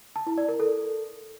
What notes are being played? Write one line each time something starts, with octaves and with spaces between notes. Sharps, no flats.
A5
E4
D5
A#4
A4